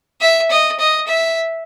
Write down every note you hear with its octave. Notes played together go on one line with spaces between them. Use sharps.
E5
D#5
D#5
E5